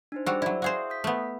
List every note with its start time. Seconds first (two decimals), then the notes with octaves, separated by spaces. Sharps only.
0.12 D4 D#4 C5
0.26 G3 F#4 G#4 C5 E6
0.42 F#3 E4 D5
0.62 F#4 G#4 C5 E5 F5 D#6
0.90 D#6 G6 B6
1.04 A3 B3